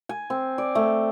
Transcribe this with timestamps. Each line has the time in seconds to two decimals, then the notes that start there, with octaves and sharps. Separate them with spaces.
0.09 G#5
0.30 C4
0.58 D5
0.75 A3